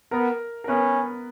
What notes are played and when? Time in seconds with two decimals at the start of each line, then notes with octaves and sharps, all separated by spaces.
0.11 B3 A#4 A#5
0.64 A#4
0.68 B3 C#4 B4